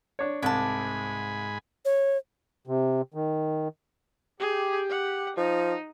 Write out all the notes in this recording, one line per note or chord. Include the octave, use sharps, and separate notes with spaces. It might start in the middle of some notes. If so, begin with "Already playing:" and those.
D4 C#5
C2 G#2 G#5 A5 B5 D6
C#5
C3
D#3
G4 G#4
F#5
F3 D#4